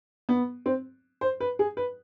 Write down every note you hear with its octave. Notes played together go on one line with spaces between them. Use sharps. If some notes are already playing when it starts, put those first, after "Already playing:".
B3
C4
C5
B4
G#4
B4